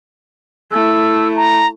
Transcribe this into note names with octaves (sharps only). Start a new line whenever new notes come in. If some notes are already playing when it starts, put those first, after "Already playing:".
A3 E4 E6
A#5